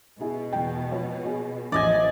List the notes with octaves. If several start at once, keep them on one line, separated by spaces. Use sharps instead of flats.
B2 E4 G#4
E2 G5
F3 C#5
G#4
A1 D#2 F3 D5 D#5 G#5